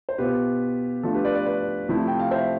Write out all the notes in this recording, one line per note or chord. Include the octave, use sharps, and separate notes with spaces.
C5
B2 B3 F4 G4 B4
F3 A3 D4 F4 A4
G4 B4
B4 D5
B4 D5
B4 D5
C3 F3 A3 E4
G5
F5
C5 E5